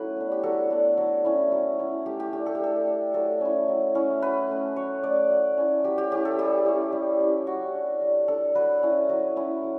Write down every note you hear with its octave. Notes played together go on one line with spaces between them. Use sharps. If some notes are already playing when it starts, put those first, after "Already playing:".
Already playing: F#3 A3 C#4 E4 B4 C#5
B3 D4
G4
F#3 A4
B3 D4
F#3
C#4 E4
F#3
C#4 E4
A3 G4
G4
D4 G4
A4
G4
A3 A4
D4
F#3 A4
C#4 E4
F#3
C#4 E4
F#3 B4
A3 C#4
F#3 C#5
A3 C#4 D5
F#3
C#4 E4
F#3 G4
G4
C#4 E4 G4
A4
G3 G4
C#4 E4
G3
C#4 E4
G3 F#4
D4
G3
D4 A4
F#3 B4
C#4 E4
F#3
C#4 E4
F#3